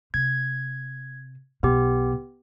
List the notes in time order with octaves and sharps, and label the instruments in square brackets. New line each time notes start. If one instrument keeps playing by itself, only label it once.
[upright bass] C3 [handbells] G#6
[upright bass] B1 B2 [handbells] B3 G4